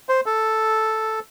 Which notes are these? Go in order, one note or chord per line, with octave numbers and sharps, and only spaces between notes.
C5
A4